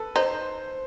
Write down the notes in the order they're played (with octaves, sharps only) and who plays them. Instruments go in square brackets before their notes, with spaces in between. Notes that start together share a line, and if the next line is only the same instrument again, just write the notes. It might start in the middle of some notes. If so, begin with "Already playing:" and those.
Already playing: [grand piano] A4 B4
[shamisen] D#4 [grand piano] C5